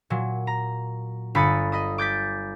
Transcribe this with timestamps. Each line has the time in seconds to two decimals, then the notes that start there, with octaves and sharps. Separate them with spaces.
0.10 A#2 F#3
0.47 A#5
1.35 G1 B5 D#6 A6 C#7
1.72 D#5 B5 D#6
1.98 D6 G6 A6 B6